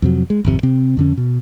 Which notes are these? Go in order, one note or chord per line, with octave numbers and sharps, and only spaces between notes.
F2 C3 F#3
G#3
G#1 F2 C3
C3 C4
F2 D3 C#4
B2